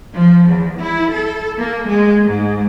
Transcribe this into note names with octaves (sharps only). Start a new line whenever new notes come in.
F3
E2
E4
A4
A#3
G#3
G#2